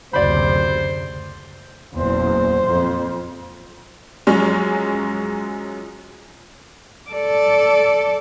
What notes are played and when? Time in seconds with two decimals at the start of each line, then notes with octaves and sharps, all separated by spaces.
0.13 F#1 D2 C3 C5 D5 B5
1.95 F#1 E2 A#2 C5
2.64 F2
4.27 F#2 F3 F#3 G#3 C#4
7.10 A4 D5